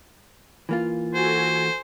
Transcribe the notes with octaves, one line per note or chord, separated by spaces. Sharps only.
E3 A#3 F4
F#4 A4 C5 G#5